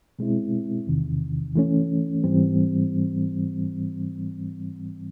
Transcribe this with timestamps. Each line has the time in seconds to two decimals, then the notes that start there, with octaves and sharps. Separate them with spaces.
0.19 B2 G#3 C4 E4
0.87 E2 C3 D#3
1.55 E3 A3 C#4
2.24 G#2 E3 G3 C4